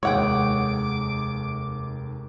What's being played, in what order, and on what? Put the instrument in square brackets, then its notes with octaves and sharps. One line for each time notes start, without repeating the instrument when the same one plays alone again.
[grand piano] F1 D#2 [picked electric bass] G#3 [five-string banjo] C#5 F#5 G5 [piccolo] D6